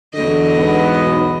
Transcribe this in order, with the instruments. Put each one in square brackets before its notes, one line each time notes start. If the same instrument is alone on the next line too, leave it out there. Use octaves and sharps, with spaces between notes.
[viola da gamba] E2 F#3 D#5 [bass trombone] D3
[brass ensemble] G#2 B3
[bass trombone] B1